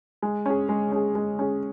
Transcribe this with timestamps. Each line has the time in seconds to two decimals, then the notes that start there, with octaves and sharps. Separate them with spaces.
0.22 G#3
0.46 C#4 G#4
0.69 G#3
0.92 C#4 G#4
1.15 G#3
1.39 C#4 G#4